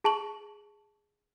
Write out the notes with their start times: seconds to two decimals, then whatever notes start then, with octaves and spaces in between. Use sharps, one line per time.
0.04 G#4 A5 C#6 F#7